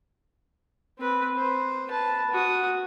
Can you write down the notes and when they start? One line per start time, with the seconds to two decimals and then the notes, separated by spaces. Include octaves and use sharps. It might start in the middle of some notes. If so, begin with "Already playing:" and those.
0.99 C4 B4
1.37 C5
1.89 B4 A5
2.30 F#4 D#6